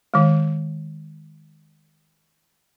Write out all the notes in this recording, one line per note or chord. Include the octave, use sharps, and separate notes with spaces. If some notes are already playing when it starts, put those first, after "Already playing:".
D#3 G#3